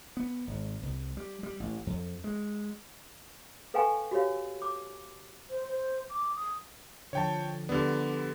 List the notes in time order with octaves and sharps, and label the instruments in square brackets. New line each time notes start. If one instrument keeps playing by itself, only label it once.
[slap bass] B3
G#1
C2
G3
G3
A1
F2
G#3
[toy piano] A4 B4 F5 G5 G#5 C#6
F#4 G4 C#5 F5
D6
[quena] C5
C5
D6
D#6
[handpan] D3 F3 [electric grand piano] C#5 G5 A5
[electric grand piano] D3 B3 [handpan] G3 G4 D5